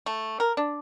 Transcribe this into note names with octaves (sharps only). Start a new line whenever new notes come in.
A3
A#4
D4